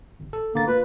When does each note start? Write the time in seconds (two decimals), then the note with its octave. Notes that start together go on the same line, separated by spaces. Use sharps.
0.20 G1
0.33 A4
0.55 D3 A#3 A6
0.68 A#3 F4 B4